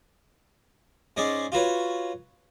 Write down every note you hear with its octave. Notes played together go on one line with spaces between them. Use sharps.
G#2 G#3 C#4 G#4 D5
F4 F#4 B4 C#5